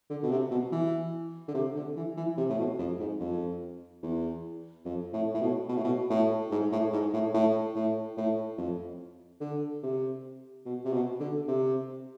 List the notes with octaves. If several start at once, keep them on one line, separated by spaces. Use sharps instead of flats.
D3
B2
C3
B2
E3
D3
C3
D3
E3
E3
C3
A2
B2
F2
G#2
F2
E2
F2
A2
A2
B2
B2
A2
B2
A2
G#2
A2
G#2
A2
A2
A2
A2
F2
D3
C3
B2
C3
B2
D3
C3